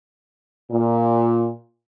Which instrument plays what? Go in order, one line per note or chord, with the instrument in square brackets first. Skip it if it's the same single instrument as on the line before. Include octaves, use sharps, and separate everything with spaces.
[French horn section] A#2